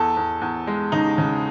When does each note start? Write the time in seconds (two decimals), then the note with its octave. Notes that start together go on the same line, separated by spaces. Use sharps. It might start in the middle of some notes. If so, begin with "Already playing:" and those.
Already playing: E2 A4
0.17 E2
0.41 E2
0.67 G#3
0.92 C#3 D#4
1.18 C#3